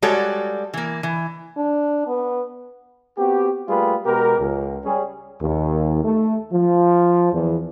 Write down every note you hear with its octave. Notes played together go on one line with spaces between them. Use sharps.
G3 G#3 F#4 A4 C#5 D5
E3 A#3
E3
D4
B3
B3 C4 F#4 G4
G3 A3 A#3 F4 G#4 B4
B2 G#3 B3 G4 A#4
C#2
G3 C#4 G#4
D#2
A3
F3
E2